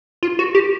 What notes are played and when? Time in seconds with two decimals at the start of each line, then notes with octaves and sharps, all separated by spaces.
0.23 F4
0.39 F#4
0.55 G4